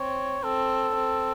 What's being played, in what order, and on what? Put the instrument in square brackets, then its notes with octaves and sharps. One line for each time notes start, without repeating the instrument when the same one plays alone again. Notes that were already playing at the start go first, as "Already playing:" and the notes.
Already playing: [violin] C4 [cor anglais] C#5
[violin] C4 [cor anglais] A4
[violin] C4